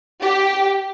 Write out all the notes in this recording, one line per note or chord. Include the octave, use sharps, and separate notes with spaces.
G4